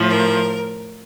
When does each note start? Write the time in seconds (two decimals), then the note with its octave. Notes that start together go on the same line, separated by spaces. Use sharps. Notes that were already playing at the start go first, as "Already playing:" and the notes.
Already playing: A2 F3
0.09 A#4